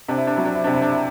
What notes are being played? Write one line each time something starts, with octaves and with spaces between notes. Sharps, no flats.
C3 D4
E4
D4
F#3 E4
D4
E4
C3 D4
E4
D4
E4